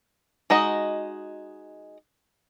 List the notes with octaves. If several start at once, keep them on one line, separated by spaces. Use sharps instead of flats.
G#3 D#4 F#4 D#5